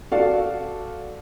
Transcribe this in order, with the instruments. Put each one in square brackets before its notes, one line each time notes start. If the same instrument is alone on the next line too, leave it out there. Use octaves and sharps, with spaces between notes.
[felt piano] F#4 A4 D5 F5